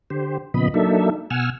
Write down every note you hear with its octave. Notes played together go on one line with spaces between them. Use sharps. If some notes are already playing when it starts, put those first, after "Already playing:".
D3 G4 C5
A#2 C#3 F3 B3 D#5 B5
F#3 A#3 D4 D#4 A4 E5
B2 F#5 G#5 E6 F6